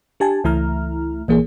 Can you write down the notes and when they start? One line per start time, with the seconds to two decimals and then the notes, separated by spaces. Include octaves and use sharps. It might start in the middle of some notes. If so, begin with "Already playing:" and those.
0.20 D4 G4 G#5 A5
0.44 C#2 E3 A3 E4 A#5 F6
1.28 A#1 E3 A#3 G#4